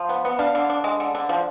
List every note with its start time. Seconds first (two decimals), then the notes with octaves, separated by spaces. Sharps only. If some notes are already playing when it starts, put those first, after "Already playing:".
Already playing: F3
0.09 B3
0.25 B3
0.39 D4 F5
0.55 D3
0.70 D4
0.84 G#3
1.00 D3
1.15 D3
1.29 F3